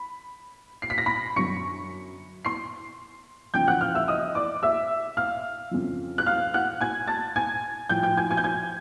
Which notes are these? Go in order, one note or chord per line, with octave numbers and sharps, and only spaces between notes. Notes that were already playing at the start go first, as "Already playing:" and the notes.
Already playing: B5
C7
B6
A#6
B5 B6
F#2 D3 F#3 C#6 C#7
C6 C7
E2 C#3 F3 G5 G6
F#5 F#6
F5 F6
E5 E6
D#5 D#6
D5 D6
E5 E6
F5 F6
F2 C#3 F3
F#6
F5 F6
F#5 F#6
G#5 G#6
A5 A6
G#5 G#6
A2 F3 G5 G6
G5 G6
G#5 G#6
G#5 G#6
G6
G#5 G#6